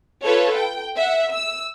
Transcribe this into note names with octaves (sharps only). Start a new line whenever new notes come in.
F4 A4 B4 C#5
G5
E5 F#5
E6